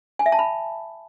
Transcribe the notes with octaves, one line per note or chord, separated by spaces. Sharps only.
G#5
E5
A5
B5